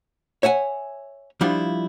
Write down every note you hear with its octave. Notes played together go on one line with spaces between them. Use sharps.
C#5 E5 F#5 G#5
F3 G3 D4 E4 F4